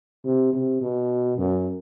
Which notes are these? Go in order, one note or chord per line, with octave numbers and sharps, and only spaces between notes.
C3
C3
B2
F#2